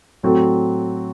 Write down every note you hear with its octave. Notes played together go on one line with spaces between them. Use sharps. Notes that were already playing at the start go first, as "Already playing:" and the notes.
A2 F#3 C4 F#4 A4